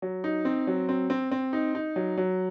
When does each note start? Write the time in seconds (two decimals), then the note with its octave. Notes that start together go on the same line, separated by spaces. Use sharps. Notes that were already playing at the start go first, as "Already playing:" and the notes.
0.02 F#3
0.24 D#4
0.45 C4
0.67 F#3
0.89 C4
1.10 C4
1.31 C4
1.53 D#4
1.75 D#4
1.96 F#3
2.18 F#3